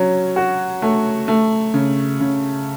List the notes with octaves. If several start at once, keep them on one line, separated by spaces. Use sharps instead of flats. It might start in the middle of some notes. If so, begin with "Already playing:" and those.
Already playing: F#3 C#4
F#4
A3
A3
C#3
C#3